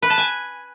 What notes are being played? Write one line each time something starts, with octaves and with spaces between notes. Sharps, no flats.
B4
A5
G#5